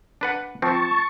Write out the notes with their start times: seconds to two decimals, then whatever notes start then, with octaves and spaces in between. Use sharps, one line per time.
0.21 D4 B4 F#5
0.62 F3 C4 A5 C#6